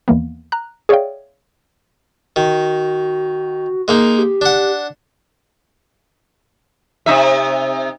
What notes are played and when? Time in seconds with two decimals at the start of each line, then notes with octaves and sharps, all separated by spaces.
0.08 D#2 E3 A#3 B3
0.52 A#5 F#6
0.89 G#4 C#5 D5 E5 F5 G5
2.36 D#3 F#4
3.88 G#3 A#3 D#4
4.18 G4
4.41 D4 F#5
7.06 C3 D#4 E5